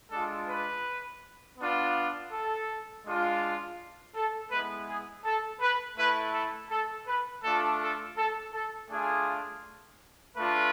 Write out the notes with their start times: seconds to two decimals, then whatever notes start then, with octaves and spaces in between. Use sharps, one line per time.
0.11 G#3 D4 F4 A4
0.48 B4
1.58 B3 D4 F4
2.31 A4
3.05 G#3 D4 F4
4.14 A4
4.51 G#3 B3 E4 B4
4.88 G#4
5.24 A4
5.61 B4
5.97 A3 E4 B4
6.33 A4
6.70 A4
7.07 B4
7.43 A3 D4 F4 A4
7.80 A4
8.17 A4
8.53 A4
8.90 A3 D4 F4 G#4
10.36 A3 D4 F4 B4